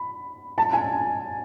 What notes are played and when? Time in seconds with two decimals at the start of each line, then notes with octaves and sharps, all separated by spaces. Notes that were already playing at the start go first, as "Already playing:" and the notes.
Already playing: B5
0.58 A5
0.73 G#5